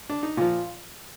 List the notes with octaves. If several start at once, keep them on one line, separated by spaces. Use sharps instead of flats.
D4
D#4
A#2 F3 F4